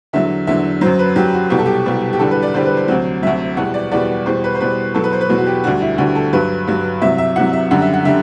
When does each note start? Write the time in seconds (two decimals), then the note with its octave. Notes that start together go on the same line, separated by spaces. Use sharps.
0.13 E2 D3 F#3 E5
0.47 E2 D3 F#3 E5
0.81 F#2 F#3 C5
0.99 B4
1.16 F#2 F#3 G4
1.34 F#4
1.50 C2 B2 G3 G4
1.59 A4
1.65 G4
1.86 C2 B2 G3
2.13 G4
2.19 E2 D3 G3 A4
2.31 B4
2.42 D5
2.54 E2 D3 G3 C5
2.66 B4
2.77 C5
2.88 D2 C3 F#3
3.23 D2 C3 F#3 E5
3.57 E2 B2 G3 F#5
3.74 D5
3.91 E2 B2 G3 D5
4.26 E2 B2 G3 C5
4.44 B4
4.55 C5
4.60 E2 B2 G3 B4
4.94 E2 B2 F#3 A4
5.04 B4
5.13 C5
5.21 B4
5.29 E2 B2 F#3
5.38 F#4
5.46 G4
5.64 D2 D3 G3 F#4
5.81 E4
5.98 D2 D3 G3 F#4
6.15 A4
6.33 G2 F#3 B4
6.67 G2 F#3
7.01 C2 C3 F#3 E5
7.18 E5
7.36 C2 C3 F#3 F#5
7.53 E5
7.71 F#2 D3 G3 F#5
7.82 E5
7.93 F#5
8.05 D3 G3 E5